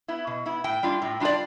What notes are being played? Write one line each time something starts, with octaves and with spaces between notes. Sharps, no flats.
B3 E4
B2
B3 E4
A2 G5
G3 D4 F4
A2
G3 D4 F4 D5